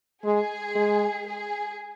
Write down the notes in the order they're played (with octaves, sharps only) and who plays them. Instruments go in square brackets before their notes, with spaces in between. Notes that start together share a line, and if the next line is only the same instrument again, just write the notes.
[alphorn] G#3 [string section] G#4
[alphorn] G#3
[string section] G#4